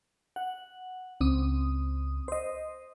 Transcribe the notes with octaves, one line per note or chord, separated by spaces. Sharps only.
F#5
C#2 C4 D#6
C5 D#5